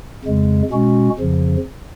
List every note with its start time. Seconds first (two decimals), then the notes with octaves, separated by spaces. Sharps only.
0.24 F2 C#3 G#3
0.71 B2 G#3 C#4 F#4
1.19 F2 C#3 F3